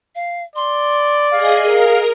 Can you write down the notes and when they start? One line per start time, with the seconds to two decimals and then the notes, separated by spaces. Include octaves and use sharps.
0.15 F5
0.56 D5 C6
1.30 G#4 D#5 F5
1.63 G#4 A#4